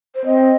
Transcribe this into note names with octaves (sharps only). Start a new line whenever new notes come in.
C5
C4 D#5